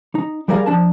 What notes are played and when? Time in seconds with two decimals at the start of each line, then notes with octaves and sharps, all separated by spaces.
0.15 D#4
0.48 F#3 G3 G#4 A#4 D5 F5
0.66 F3 D4 A5